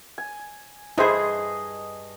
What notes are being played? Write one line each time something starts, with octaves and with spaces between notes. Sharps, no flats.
G#5
G2 E4 G#4 C5 D#5